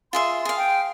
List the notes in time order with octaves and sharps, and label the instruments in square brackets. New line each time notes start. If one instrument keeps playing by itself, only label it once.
[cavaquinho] F4 G#4 E5 [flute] C6
[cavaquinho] G#4 F5
[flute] G5